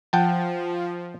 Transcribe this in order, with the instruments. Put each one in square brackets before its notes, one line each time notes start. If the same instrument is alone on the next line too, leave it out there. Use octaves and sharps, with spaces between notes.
[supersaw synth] F3 [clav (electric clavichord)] F#5 G5 A5